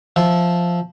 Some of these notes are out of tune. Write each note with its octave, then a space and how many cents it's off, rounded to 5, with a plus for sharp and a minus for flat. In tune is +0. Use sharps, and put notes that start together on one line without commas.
F3 +0 E5 +0